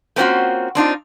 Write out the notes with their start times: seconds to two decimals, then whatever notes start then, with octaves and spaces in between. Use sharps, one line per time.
0.16 A3 A#3 C4 C#4 F4 F#4
0.75 C4 D4 D#4 F4